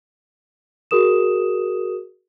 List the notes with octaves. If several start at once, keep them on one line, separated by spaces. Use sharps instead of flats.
F#4 G#4 A#4 D#6 E7